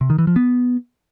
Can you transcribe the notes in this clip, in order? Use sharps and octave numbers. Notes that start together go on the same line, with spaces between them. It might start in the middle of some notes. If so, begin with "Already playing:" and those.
C3
D#3
E3
F3
B3